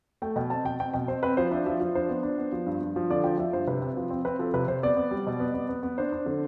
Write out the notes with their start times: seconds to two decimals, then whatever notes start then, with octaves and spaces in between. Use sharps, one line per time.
0.22 A3 G5
0.36 B2 G5
0.50 C4 A5
0.65 B2 G5
0.80 C4 G5
0.94 B2 G5
1.08 C4 C5
1.23 C4 B4
1.37 F3 C5
1.51 D4 E5
1.66 F3 E5
1.80 F3
1.95 D4 C5
2.09 B3
2.23 D4
2.38 B3
2.52 F3
2.66 G2
2.81 G2
2.96 F3
3.10 D3 D5
3.24 F3 G5
3.38 F3 E5
3.53 G2 C5
3.67 C3 B4
3.81 C4
3.97 F3
4.10 C4
4.25 C4 B4
4.39 F3 A4
4.54 C3 B4
4.68 C3 C5
4.83 B3 D5
4.97 B3
5.11 G3
5.27 B2
5.40 B3
5.54 B3
5.69 B3
5.83 B3
5.98 D4 C5
6.12 D4
6.26 D3